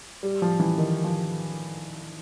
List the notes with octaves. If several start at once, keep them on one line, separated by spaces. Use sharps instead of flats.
G3
F3
E3
D#3
F3